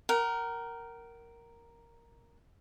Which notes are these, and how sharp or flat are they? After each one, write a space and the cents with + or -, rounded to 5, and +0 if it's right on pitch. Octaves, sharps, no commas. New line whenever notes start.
A#4 +0 F#5 +45